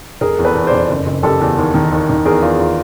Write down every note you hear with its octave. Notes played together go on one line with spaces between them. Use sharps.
F1 G#4 A#4
E2
A4 B4
E2
C5 D5
F1
F#1
F#1
F#1 G4 A4
E2
D#2
D#3
D#2
D#3
E2 G#4 A#4
E2 F4
F4